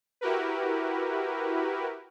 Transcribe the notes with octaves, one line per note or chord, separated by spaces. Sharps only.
E4 F#4 G4 A#4 B4